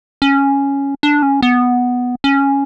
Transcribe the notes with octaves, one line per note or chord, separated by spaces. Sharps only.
C#4
D4
C#4
B3
C#4